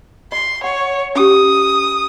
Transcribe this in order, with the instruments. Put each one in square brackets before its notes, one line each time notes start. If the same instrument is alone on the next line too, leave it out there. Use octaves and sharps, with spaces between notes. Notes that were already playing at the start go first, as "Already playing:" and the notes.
[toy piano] D#5 [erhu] C6
[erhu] C#5 [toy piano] F#5
[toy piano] C#4 G4 [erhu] D#6